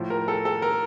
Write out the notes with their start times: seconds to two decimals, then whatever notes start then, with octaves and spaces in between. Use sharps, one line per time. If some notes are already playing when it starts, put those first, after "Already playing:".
Already playing: A2 F3
0.10 A#4
0.28 A4
0.45 A4
0.62 A#4